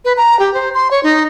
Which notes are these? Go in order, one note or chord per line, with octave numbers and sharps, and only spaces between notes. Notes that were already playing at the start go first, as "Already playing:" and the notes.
B4
A#5
G4
C5
C6
C#5
D#4